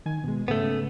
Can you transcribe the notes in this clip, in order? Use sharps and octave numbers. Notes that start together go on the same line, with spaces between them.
D#3 G#5
B2 G#3
G#2 C#3 A3 B3